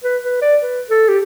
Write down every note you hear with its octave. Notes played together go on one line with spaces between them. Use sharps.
B4
B4
D5
B4
A4
G4